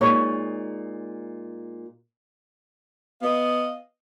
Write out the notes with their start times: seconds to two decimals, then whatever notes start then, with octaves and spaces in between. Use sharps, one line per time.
0.01 A#2 G#3 A#3 D#4 C#5
3.22 B3 D#5 F5